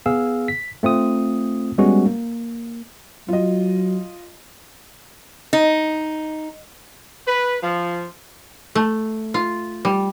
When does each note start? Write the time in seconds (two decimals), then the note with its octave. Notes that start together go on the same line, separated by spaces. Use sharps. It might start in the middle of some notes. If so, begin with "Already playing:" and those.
0.06 B3 G#4 F5 E6
0.48 B6
0.83 A3 C4 F4 D#6
1.78 G3 G#3 B3 C#4 F#4
2.06 A#3
3.28 F#3 F4 D#5
5.53 D#4
7.27 B4
7.62 F3
8.75 A3
9.34 F4
9.85 G3